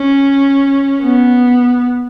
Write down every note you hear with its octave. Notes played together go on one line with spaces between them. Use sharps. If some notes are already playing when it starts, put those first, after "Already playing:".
Already playing: C#4
B3